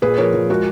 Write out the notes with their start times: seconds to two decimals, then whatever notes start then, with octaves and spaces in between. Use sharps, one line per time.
0.02 A#2 G#4 B4
0.18 F3 A#4 C#5
0.34 F3
0.50 G#3 F#4 A#4